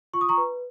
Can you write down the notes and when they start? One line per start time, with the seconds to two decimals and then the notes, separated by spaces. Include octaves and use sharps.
0.14 F4 C#6
0.21 D#6
0.29 A#5 C#6
0.38 B4